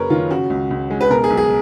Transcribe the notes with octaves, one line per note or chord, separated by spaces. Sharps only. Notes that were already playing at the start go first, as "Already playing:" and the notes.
Already playing: F#1 F#3 G#4 A#4 B4 C#5
D#3 F4
C#3 F#4
C#2
C#2
G#3
B4
B2 A#4
G#4
B1
G#4